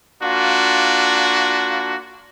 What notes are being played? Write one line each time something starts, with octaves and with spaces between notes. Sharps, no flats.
A#3 D4 F4 F#4